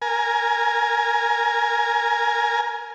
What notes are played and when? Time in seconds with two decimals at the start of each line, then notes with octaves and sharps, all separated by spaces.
0.02 A#4 G#5